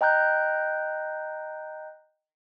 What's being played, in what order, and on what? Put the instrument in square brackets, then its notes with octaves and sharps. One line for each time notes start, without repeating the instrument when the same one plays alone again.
[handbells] D#5 G5 A#5 F#6 G6